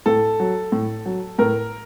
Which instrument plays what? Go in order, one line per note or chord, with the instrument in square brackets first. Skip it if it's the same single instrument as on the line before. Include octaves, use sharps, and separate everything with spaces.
[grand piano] A2 A4
F#3
A2
F#3
A2 A#4